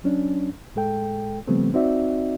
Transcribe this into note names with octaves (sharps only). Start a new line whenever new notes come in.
F#3 C#4 D4
A2 G#3 A4 G5
C#3 F3 G3 A3 B3 C4
C4 D#4 F#4 D5 E5